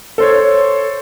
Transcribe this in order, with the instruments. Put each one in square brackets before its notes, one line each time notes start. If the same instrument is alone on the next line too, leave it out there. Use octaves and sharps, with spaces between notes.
[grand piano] A4 C5 C#5